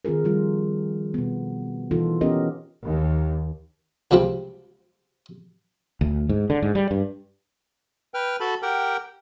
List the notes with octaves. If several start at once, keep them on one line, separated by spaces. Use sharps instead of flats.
D#3 C4 F4 G#4 A#4
F3 G3 F4
B2 B3
B2 E3 D#4 F4 A4
B3 C#4 G4 A#4 D#5
D#2
C#2 C3 F3 G3 C4
D2
G#2
D3
G#2
G3
G2
B4 G5 F6
F#4 A4 A5 B5
G4 A#4 F#5 G5